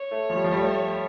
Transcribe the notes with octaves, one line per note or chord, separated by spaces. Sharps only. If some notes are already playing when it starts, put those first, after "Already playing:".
Already playing: C#5
A3
F3
G3
F3
G3
A3